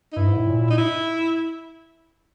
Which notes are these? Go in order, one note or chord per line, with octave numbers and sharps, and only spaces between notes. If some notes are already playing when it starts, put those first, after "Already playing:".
D#4
G2 E4
G#2
A2
A#2
D#4
E4